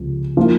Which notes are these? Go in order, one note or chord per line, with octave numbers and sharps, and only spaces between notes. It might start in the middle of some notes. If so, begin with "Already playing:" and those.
Already playing: C#2 C3 F3
F3 A#3 F4